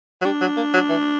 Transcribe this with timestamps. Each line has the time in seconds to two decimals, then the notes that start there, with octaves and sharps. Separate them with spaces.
0.22 F#3
0.25 G3 D4
0.41 F#3
0.57 A#3
0.74 F#3
0.90 E3